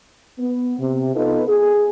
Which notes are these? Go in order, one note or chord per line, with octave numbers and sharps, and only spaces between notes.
B3
C3
B3 D#4 F4 A4 B4
G#4